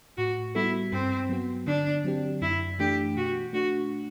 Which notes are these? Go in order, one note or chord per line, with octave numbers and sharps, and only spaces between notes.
A2 F#4
G3 B3 E4 F#4 A4
G2 C4
F#3 B3 F#4
D3 D4
F#3 C4 G4
F#2 E4
E3 A3 D4 G4
B2 F#4
A3 D4 F#4